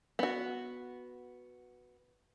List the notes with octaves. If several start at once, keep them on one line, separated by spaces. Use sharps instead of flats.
B3 F#4